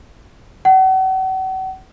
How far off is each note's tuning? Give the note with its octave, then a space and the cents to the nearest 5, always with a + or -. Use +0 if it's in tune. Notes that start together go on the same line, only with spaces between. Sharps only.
F#5 +40